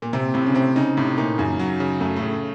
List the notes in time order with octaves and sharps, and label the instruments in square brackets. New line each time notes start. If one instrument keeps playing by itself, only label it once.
[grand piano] A#2
[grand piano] C3 [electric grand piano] C4
[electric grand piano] A2 [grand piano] C3
[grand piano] C#3
[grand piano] C3 [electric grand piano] C4
[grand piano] C#3 [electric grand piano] D#4
[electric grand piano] A2 [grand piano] C3
[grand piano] A#2 [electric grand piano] D#4
[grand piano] F#2 [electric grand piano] C#3
[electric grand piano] F#3
C#3
[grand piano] F#2 [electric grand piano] A3
[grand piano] A2
[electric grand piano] C#3